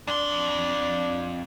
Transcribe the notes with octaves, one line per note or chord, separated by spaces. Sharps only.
F2 D4 C6